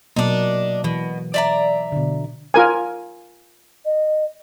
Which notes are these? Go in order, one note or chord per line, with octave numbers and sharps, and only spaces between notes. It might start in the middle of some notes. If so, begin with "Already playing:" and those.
B2 F#3 A#3 D4 D#4
B2 E3
D5 E5 A#5
B2 D3
F4 A#4 G#5
D#5